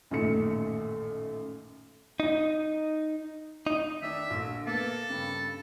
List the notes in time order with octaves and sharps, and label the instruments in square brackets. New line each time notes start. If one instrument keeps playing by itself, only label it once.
[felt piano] A1 F#2 A#2 D#3 A3 C#7
[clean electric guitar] D#4
D#4
[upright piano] D#3 D4 [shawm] E5
[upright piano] A#1 D3
[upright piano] A#3 B3 [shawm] A4
[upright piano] G2 C#3